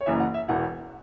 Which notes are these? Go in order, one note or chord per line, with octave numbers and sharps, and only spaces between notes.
C#5
F#1 F#2 E3 E5
F#5
E5
E1 E2 E3 F#5